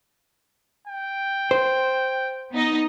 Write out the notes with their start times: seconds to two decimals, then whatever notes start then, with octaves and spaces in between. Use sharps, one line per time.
0.87 G5
1.51 C5
2.53 B3 D#4 D#5